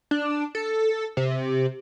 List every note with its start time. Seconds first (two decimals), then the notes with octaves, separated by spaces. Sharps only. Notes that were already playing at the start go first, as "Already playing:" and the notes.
0.11 D4
0.55 A4
1.17 C3